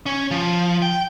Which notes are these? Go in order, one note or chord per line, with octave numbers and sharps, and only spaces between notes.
C#4
F3
G5